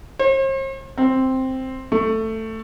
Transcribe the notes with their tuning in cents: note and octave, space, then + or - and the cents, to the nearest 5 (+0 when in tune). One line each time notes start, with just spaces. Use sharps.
C5 +45
C4 +0
A3 +10